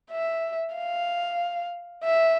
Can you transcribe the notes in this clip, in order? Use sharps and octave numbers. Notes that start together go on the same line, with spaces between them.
E5
F5
E5